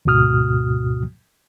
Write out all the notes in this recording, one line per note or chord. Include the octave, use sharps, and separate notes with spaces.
D2 G#2 B2 F#4 D#6 F6